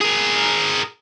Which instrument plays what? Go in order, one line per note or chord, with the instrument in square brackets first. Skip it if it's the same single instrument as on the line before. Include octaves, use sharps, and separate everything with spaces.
[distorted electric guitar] G#4 A#4